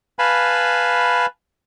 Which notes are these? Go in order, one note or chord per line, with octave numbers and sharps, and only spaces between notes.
B4 F5 G#5 A5 B5